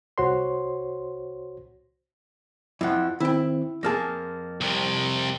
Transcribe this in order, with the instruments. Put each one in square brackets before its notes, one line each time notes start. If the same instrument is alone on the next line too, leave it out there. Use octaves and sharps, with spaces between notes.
[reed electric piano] C2 F#4 C5 C#5 C6
[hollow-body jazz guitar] F2 F3 [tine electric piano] E4 F#5
[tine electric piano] D#3 C4 [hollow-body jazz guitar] E4 G5
[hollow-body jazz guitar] F2 A#3 G#4 [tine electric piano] A5 F6 A#6
[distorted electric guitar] C2 C3